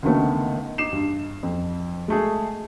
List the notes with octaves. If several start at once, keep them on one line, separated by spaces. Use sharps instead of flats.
C#2 D3 D#3 A3 B3
D#4 D6 C7 E7
G2
F2
G#3 A3 G#4